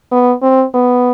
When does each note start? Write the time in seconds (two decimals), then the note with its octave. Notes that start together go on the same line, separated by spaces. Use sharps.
0.12 B3
0.42 C4
0.75 B3